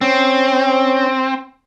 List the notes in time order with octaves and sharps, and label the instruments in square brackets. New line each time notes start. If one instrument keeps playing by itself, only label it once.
[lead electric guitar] C4 [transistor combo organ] C#4